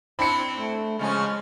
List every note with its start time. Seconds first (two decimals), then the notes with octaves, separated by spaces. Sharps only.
0.19 C4 D4 E4 B5 C#7
0.58 A3
0.99 C#3 F3 G#3 C#4